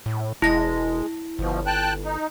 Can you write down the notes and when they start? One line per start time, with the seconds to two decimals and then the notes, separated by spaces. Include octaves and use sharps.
0.06 A2
0.42 E1 G#3 E4 A#6
1.39 G1 B2 F3
1.66 G5 A5 F#6
2.05 D#4